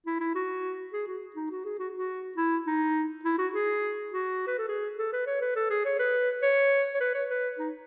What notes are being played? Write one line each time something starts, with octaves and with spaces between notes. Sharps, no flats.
E4
E4
F#4
G#4
F#4
D#4
F#4
G#4
F#4
F#4
E4
D#4
E4
F#4
G#4
F#4
B4
A4
G#4
A4
B4
C#5
B4
A4
G#4
C#5
B4
C#5
C#5
B4
C#5
B4
D#4